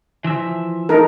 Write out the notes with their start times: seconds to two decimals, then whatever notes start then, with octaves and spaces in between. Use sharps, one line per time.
0.24 E3 F3 E5
0.89 D#4 A4 A#4